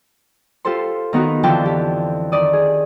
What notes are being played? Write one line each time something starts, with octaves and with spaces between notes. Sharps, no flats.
F4 G4 A4 C5 C6
D#3 B3 D#4 F#4 B4
F2 D3 E3 F3 G5 A5
G4
D#3 D5 D#6
G#4